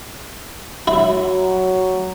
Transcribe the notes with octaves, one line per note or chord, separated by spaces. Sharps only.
F#3 E4